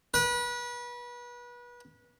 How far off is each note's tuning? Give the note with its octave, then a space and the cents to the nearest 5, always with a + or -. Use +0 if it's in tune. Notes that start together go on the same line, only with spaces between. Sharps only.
B4 -30